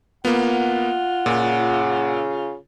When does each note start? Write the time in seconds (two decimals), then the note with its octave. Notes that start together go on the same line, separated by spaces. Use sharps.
0.25 A#3 B3 F4 F#5
1.26 A#2 C#3